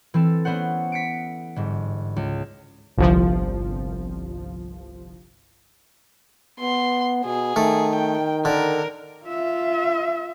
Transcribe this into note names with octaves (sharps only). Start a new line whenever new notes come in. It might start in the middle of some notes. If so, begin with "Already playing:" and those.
E3 C4 A4
A3 B3 C#4 C5 F#5
B6 C#7 D7
G1 G#2
C#2
G1 C2 F3
B3 C6
B2 G#4
D#3 A3
G5
D3 A#4
F4 E5